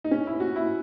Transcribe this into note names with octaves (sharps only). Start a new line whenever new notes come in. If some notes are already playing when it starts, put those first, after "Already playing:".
D#4
C#4
E4
F#4
E4